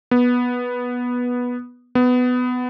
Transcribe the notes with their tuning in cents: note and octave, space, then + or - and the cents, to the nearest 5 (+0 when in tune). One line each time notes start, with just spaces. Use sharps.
B3 -10
B3 +15